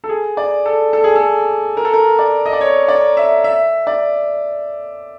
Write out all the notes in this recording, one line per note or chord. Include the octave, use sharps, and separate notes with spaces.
A4
G#4
D5
A4
A4
G#4
A4
A#4
A4
A#4
D5
D#5
D5
C#5
D5
E5
E5
D5